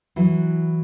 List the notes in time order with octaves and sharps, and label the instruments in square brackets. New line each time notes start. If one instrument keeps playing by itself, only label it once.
[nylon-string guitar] E3 F#3